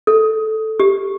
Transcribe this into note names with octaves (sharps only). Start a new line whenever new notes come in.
A4
G4